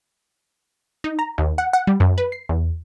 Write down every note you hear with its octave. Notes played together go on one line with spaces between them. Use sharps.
D#4
A#5
D#2
F#5
F#5
G3
F#2
B4
C7
E2